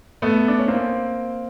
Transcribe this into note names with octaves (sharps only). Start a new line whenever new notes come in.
A3 B3
D4
C#4
A#3 C4